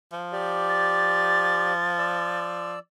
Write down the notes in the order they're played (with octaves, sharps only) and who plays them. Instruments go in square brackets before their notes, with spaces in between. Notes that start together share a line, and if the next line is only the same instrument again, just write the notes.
[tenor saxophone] F3
[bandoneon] G4 D5
[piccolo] A6
[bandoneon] D5 E6